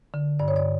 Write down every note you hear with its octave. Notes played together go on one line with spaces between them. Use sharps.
D3
G2 D5
C#5
D5